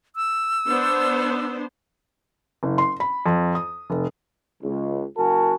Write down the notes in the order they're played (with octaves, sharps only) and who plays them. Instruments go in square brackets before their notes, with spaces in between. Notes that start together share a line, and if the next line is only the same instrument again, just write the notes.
[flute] E6
[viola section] B3 D4 C5
[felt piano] F#1
C6
B5
F2
D#6
F1
[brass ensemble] C#2
F#1 F#4 A#4 F#5 G#5 A5